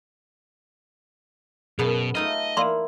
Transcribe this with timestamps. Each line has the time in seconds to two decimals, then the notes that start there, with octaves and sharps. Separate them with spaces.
1.79 F#2 B2 B3 G#4 A5
2.15 A3 D#4 F4 D#5
2.57 A#3 E4 D5 F5 C6